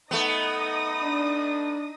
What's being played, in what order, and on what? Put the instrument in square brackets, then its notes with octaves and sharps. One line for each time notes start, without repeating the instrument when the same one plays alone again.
[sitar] A3 B3 [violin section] D#4 D#6 A#6
[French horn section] D4